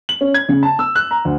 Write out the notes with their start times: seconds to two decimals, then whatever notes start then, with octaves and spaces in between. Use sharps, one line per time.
0.09 F#7
0.21 C#4
0.34 G#6
0.49 C#3
0.63 A5
0.79 E6
0.96 F#6
1.11 A#5
1.25 D2